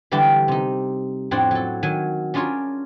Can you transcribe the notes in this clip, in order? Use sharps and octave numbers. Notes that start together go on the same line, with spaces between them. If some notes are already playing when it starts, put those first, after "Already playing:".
D3 E3 G3 E4 G4 A4
C3 D#4
F2 A2 C4 D4 C#5 F#5
F#3 A4
D#3 F#3 G#5
C#4 D4 F4 G#4 A#4 C#5